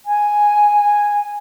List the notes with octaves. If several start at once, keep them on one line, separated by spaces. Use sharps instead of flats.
G#5